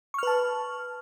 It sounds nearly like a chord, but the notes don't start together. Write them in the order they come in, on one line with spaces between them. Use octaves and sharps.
C#6 F6 B4 A5